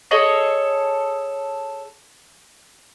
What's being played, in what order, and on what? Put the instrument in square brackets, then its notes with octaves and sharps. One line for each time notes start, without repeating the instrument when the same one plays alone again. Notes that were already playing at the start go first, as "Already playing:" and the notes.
[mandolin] G#4 A4 C#5 D#5